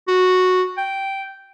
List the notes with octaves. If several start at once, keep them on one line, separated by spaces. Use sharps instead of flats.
F#4
G5